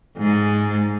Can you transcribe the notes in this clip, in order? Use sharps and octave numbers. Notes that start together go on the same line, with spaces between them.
G#2